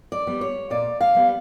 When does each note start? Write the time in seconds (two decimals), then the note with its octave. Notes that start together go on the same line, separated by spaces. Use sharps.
0.12 D5
0.27 G3 B3
0.41 C#5
0.70 A#2 D5
1.01 F5
1.15 G3 B3